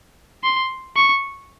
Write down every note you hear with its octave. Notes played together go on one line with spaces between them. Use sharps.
C6
C#6